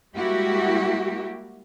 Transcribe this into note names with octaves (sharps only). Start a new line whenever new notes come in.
G3 G#3 A#3 E4 F#4 G4